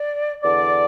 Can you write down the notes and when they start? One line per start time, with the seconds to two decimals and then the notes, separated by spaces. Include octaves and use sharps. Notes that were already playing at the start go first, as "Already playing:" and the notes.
Already playing: D5
0.43 E2 D3 D5